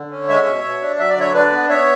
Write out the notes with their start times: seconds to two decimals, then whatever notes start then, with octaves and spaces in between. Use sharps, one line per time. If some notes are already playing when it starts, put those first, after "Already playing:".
Already playing: D3
0.11 C#4
0.29 G#3 C#5 E5
0.46 B2
0.64 B2
0.82 D4
0.99 F#3 E5
1.10 D5
1.17 D3 C#5 E5
1.34 D4 B4 D5
1.52 B3
1.69 B3 C#5 E5